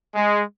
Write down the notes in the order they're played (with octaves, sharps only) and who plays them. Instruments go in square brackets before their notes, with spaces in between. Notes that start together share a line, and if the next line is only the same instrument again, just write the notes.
[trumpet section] G#3